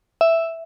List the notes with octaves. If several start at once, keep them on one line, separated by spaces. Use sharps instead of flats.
E5